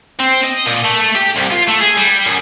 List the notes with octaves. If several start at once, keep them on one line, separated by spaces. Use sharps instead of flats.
C4
D#5
A#2
A3
A3
G4
C2
F4
A3
G#4
G3
F#2